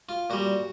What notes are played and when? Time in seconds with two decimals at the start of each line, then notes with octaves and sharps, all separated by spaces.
0.09 F4
0.30 A#2 G3 F#4